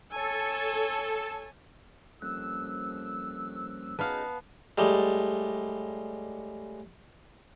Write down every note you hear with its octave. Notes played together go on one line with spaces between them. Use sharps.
A4 C#5 G#5
F2 F3 G3 A#3 C#4 E6 F#6
F#3 B3 C#4 D#4 G#4 F5 A5 B5
A2 G3 G#3